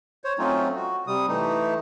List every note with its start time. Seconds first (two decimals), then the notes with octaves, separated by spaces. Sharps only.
0.24 C5 C#5
0.38 F#3 A3 C4 C#4 D#4 F4
0.75 F#4
1.07 C3 G3 D#6
1.28 E3 A3 D#4